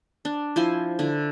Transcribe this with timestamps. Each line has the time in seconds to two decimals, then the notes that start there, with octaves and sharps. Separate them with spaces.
0.25 D4
0.56 F3 E4 C5 G#5
0.99 D3 E4